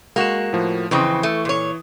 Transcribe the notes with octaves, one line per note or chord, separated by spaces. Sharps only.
G#3 A#3 F#4 E7
A2 F3
F2 C#3 E3 C4 C#6 D#6
A3
A#2 C#5